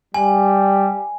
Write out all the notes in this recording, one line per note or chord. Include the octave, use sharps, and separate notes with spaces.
G3 G#5